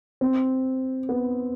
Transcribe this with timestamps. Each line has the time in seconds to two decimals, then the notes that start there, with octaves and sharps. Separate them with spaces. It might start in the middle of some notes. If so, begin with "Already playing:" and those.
0.21 C4
1.09 B3